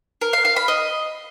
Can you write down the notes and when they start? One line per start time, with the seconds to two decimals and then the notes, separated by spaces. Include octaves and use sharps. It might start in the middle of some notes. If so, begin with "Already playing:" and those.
0.21 A#4
0.33 F5
0.45 F5
0.56 B5
0.68 D#5